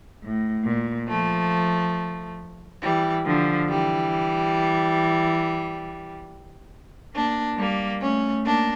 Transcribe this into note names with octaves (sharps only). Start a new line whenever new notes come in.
A2
A#2
F3 A3
E3 G3
D3 F3
E3 G3
A#3 D4
G3 A#3
A3 C#4
A#3 D4